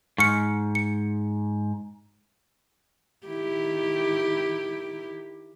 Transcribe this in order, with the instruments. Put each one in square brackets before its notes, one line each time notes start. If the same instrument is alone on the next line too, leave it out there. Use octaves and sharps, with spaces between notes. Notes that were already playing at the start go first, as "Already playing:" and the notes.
[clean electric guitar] G#2 [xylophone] C#6 F6 C#7
[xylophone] C#7
[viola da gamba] D#3 E4 G4